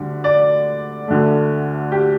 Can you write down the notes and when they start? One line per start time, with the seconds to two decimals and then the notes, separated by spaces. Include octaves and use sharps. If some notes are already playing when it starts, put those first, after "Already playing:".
Already playing: D2 D3 G3
0.24 D5
1.08 D2 D3 A3
1.92 G4